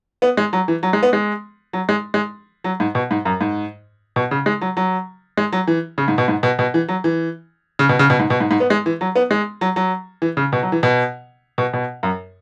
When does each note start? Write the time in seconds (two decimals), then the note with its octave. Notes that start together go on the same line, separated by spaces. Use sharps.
0.22 B3
0.37 G#3
0.53 F#3
0.68 E3
0.83 F#3
0.93 G#3
1.03 B3
1.13 G#3
1.73 F#3
1.89 G#3
2.14 G#3
2.64 F#3
2.80 G#2
2.95 B2
3.11 G#2
3.25 F#2
3.41 G#2
4.16 B2
4.31 C#3
4.46 G#3
4.61 F#3
4.77 F#3
5.37 G#3
5.53 F#3
5.68 E3
5.98 C#3
6.08 G#2
6.18 B2
6.28 G#2
6.43 B2
6.59 B2
6.74 E3
6.88 F#3
7.04 E3
7.79 C#3
7.89 B2
7.99 C#3
8.10 B2
8.19 G#2
8.30 B2
8.40 G#2
8.51 G#2
8.60 B3
8.70 G#3
8.86 E3
9.01 F#3
9.16 B3
9.31 G#3
9.61 F#3
9.76 F#3
10.22 E3
10.37 C#3
10.53 B2
10.63 F#3
10.72 E3
10.83 B2
11.58 B2
11.73 B2
12.03 F#2